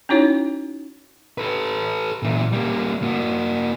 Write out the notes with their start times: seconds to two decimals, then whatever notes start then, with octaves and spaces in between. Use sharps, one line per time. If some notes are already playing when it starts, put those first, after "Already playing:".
0.09 C#4 D#4 E4 F#4 C#5
1.38 A4 B4
2.23 A#2 E3
2.52 G3 A#3
3.03 A#3 F#4